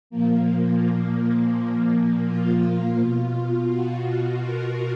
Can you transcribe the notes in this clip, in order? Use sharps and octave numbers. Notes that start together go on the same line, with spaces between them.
A#2 F3 A#3
A#3
F4
B2
F#4
A#4